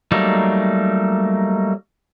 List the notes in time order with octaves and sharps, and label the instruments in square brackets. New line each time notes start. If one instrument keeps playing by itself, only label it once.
[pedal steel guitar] F#3 G3 A3 A#3 D#4